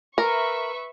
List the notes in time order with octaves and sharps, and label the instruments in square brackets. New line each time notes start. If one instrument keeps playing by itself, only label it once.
[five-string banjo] A#4 [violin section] B4 E5 C#6